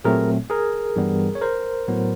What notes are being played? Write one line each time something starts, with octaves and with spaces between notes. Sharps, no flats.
A#2 F#3 A3 C4 G#4 A#4
G#4 A#4
G2 E3 G3 B3
C#5
A#4 C5
A2 F#3 B3